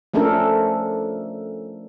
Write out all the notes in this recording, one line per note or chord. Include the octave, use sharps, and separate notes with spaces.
F3 A3 C#4 D4 A4 A#4